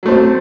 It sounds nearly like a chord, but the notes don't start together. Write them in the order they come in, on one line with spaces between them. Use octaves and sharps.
F#3 A3 C4